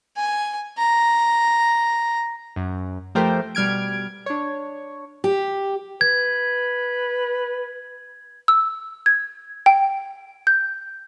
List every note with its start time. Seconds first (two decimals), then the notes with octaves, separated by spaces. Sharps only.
0.16 G#5
0.78 A#5
2.56 F#2
3.15 F3 A3 G4 A#4 C5 G5
3.55 B2 G3 F6 G#6 D7
4.26 D4 C#5
5.24 G4
6.01 B4 G#6
8.48 E6
9.06 G#6
9.66 G5
10.47 G6